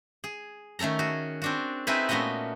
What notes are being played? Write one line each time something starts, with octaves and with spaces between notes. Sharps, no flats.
G#4
D#3 A3 C#4 A4 A#5
F#4 G#4
C4 D4 F#4
C4 D#4 E4 G#4 A4 B4
A#2 A3 B3 C#4 F#4 D#5